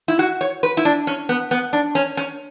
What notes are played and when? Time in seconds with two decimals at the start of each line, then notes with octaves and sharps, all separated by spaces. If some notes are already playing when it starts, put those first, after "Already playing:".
0.08 E4
0.19 F#4
0.41 C#5
0.63 B4
0.77 E4
0.85 D4
1.07 C#4
1.29 B3
1.51 B3
1.73 D4
1.95 C#4
2.17 C#4